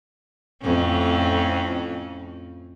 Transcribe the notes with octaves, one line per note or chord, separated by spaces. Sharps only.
F2 A2 C#4